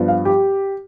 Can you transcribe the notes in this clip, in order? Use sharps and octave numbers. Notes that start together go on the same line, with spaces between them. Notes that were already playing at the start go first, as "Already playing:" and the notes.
Already playing: G2 F3 B3
F5
G4